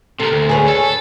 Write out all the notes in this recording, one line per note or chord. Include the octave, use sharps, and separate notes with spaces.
C3 A4 A#4
D2
G#4 B4 C#5
A4